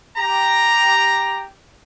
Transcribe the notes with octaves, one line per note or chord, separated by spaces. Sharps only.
G4 A#5